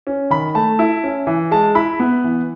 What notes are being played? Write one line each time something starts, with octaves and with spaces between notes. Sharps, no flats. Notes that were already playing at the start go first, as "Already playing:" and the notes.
C#4
D#3 B5
A3 A5
E4
C#4
E3
G#3 A5
E4 B5
B3
E3